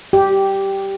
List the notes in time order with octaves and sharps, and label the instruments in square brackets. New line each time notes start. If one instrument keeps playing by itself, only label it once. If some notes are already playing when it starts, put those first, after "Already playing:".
[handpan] G4